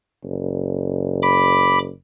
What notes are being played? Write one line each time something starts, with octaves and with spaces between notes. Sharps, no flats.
F#1
B5 D6